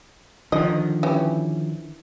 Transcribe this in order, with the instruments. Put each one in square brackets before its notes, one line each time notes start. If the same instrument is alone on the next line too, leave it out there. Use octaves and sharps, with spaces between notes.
[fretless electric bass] D3 D#3 F3 [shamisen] D#5
[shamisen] E3 C#4 G4